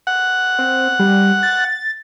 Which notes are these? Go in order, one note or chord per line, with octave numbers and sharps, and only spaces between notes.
F#5
C4
G3
A6